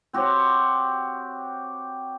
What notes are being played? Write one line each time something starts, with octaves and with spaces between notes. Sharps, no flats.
C4 F#4 G4 C#5